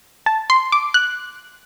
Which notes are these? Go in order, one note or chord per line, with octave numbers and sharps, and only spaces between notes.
A5
C6
D6
F#6